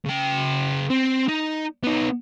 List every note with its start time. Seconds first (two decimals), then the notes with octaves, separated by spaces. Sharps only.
0.05 C#3 G5
0.90 C4
1.28 D#4
1.83 B3 D#4